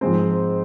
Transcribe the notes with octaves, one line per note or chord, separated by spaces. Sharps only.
G#2 F3 G#3 C4 C5